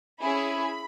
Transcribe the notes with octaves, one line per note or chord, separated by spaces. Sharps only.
C#4 E4 G#4 B5